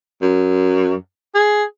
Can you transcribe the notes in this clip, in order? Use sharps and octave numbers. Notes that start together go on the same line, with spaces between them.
F#2
G#4